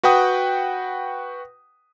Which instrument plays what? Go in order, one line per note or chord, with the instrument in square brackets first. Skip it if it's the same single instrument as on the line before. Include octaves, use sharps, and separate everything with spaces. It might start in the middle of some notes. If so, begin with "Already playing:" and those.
[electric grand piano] F#4 B4 F#5 G5 D#6